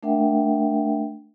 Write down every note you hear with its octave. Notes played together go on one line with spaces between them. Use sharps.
A3 D4 A#4 E5 F#5 G5